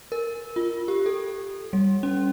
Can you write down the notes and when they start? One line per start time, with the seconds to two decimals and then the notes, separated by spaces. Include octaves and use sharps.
0.12 A#4
0.56 F4
0.88 G4
1.06 A4
1.73 G3
2.03 C#4